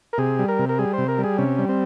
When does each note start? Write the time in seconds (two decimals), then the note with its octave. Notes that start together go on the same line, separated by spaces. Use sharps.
0.13 A#4
0.18 C3 G#4
0.39 G3
0.48 A#4
0.59 C3
0.69 A#4
0.79 G3 G#4
0.93 C3 C5
1.08 A#4
1.18 G3
1.24 G#4
1.38 C3 C#4
1.58 G3
1.69 C4